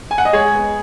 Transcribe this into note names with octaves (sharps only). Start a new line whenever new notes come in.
G#5
F#5
D#5
G#3 G#4 C#5
B3